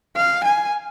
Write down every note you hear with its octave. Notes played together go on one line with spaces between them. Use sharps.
F5
G#5